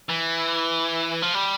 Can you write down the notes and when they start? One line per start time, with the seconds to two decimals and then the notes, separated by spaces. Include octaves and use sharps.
0.09 E3
1.22 F3
1.34 G3